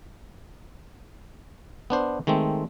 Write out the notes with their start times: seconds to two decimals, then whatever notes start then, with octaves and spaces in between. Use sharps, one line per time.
1.90 B3 D4 C5
2.27 D#3 G#3 A3 C4